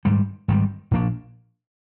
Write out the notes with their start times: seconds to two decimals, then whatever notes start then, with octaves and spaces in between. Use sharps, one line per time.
0.05 G#2 D#3 G3
0.48 G#2 D#3 G3
0.91 A#2 F3 A#3 D4